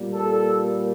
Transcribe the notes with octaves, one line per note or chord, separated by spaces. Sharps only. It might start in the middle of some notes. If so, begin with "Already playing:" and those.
Already playing: A#2 G3 A#3
A4